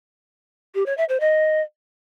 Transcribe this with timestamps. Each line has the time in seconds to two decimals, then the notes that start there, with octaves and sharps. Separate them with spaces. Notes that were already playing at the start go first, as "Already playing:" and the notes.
0.75 G4
0.86 C#5
0.97 E5
1.09 C5
1.20 D#5